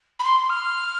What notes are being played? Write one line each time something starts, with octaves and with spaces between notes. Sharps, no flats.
B5
C6
F6